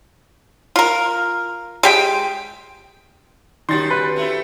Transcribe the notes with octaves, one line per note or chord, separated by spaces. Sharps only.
F4 A#4
G#3 G4 G5
D#3 G3 C#4 F#4 C6 A6
B4
A3 C4 E4